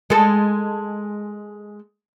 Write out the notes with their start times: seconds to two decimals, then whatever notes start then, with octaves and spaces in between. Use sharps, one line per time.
0.10 G#3 A4